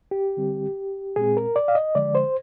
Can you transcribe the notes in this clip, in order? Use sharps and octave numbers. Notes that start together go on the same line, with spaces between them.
G4
D3 G3 C4
A#2 G#3 C4 G#4
A#4
D5
F5
D#5
D3 F3 G#3 D5
C5